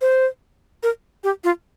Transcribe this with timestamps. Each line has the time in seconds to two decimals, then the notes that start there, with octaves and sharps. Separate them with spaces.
0.01 C5
0.83 A#4
1.24 G4
1.44 F4